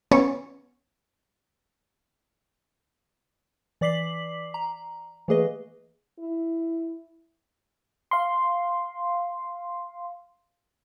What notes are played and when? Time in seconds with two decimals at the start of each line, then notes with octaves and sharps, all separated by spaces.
0.11 B3 C#4 C#5
3.81 E3 D5 D6 B6 C7 F#7
4.54 A#5
5.28 E3 A3 A#3 G#4 B4 D#5
6.19 E4
8.11 F5 C6